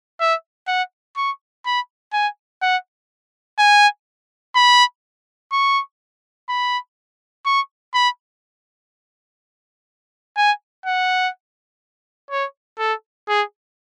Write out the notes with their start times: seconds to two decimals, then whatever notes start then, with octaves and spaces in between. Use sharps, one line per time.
0.20 E5
0.68 F#5
1.17 C#6
1.66 B5
2.13 G#5
2.62 F#5
3.59 G#5
4.55 B5
5.52 C#6
6.49 B5
7.46 C#6
7.94 B5
10.37 G#5
10.86 F#5
12.31 C#5
12.79 A4
13.28 G#4